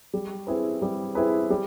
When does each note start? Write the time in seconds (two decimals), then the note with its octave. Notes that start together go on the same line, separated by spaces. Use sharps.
0.14 G3
0.47 C4 E4 G#4 B4
0.82 G3
1.15 C4 E4 G#4 B4
1.50 G3